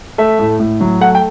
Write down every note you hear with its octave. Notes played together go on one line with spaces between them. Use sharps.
A3 E5
A2
A2
F#3
A3 F#5
G5